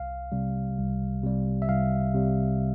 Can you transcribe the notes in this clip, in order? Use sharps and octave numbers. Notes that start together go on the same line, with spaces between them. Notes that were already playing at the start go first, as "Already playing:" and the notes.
Already playing: C2 F5
C3 G3
C2
C3 G3
E5
C2 F5
C3 G3